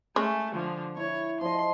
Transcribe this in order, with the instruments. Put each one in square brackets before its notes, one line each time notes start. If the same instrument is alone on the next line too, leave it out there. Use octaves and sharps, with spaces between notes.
[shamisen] G#3 C#4 [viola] A3
[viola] D3 F3
[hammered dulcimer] E4 [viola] C#5
[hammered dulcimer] F3 D#5 [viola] C6